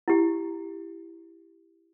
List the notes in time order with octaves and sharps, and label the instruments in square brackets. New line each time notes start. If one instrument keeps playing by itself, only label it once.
[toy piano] E4 G4